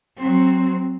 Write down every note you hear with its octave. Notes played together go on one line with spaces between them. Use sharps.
F#3 C4